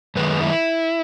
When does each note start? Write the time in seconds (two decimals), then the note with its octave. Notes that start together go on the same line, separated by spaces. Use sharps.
0.16 F#2 D#3 G#3 B4
0.41 E4